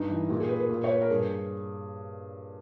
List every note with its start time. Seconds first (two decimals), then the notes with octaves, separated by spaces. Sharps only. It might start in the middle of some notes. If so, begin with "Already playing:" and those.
Already playing: G2 D#4
0.10 E3
0.29 A#2 G4
0.40 G#4
0.49 B4
0.60 B4
0.69 A#2
0.84 C#5
0.92 B4
1.02 A#4
1.10 G2 G#4